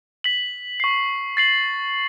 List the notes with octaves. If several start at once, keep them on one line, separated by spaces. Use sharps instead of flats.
B6 F#7
C#6 C7
A6 C7 F#7